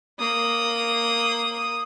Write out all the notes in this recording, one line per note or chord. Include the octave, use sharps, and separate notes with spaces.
A#3 D#6